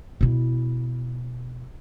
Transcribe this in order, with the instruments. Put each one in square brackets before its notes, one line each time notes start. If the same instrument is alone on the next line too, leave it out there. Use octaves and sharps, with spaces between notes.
[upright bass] B2 E4